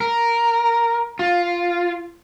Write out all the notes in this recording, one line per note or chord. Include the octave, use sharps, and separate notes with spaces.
A#4
F4